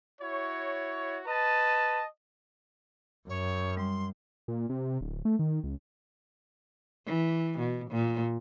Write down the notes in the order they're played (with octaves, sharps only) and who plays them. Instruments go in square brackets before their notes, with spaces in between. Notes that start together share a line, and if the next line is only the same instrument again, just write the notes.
[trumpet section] E4 F#4 C#5
B4 D#5 A5
[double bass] F#2 [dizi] C#5
[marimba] G3 [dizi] C6
[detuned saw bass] A#2
C3
D1
A3
D#3
C#2
[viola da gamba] E3
B2
A#2